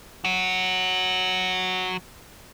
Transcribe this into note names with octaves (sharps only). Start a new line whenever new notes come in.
F#3 F#4